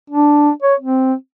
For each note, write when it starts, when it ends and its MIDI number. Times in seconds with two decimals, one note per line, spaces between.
0.10 0.50 62
0.63 0.75 73
0.80 1.13 60